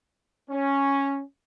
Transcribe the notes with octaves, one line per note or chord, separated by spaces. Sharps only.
C#4